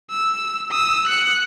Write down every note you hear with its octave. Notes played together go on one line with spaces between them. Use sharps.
E6
D#6 E6
F#6 C#7